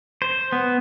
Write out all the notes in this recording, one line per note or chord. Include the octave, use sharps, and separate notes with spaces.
C5
B3